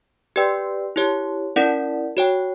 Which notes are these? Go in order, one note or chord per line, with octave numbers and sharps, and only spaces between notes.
G4 B4 D5 G5
E4 G4 C#5
C#4 E4 A#4 D5 F#5
F#4 C#5 G5